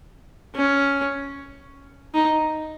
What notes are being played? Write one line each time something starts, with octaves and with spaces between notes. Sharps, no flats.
C#4
D#4